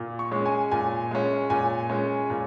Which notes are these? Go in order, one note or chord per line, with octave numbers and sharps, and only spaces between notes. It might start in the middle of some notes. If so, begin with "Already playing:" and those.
Already playing: A#2
C#6
G#3 C#4
G#5
A#2 G#5
G#3 C#4
A#2 G#5
G#3 C#4
A#2